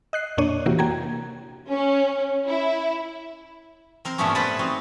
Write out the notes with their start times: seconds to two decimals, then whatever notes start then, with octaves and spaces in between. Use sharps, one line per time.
0.13 D#5 F#6 C7
0.37 F2 A#2 A#3 D4 C#5 D#7
0.66 C3 E3 A#3 E4 F#4 G4
0.79 A#3 F#4 G5 A#5 G#6
1.68 C#4
2.48 E4
4.05 C4 A#4 C5
4.18 G2 A#2 F3 A3 B3 C#4
4.35 B4 C5 F#5 G5 A5 B5
4.59 C4 D#4 F#4